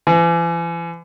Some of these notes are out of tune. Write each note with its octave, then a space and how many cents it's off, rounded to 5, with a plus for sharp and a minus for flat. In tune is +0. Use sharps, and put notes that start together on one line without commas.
E3 +40